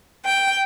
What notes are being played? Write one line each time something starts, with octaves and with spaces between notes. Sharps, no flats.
G5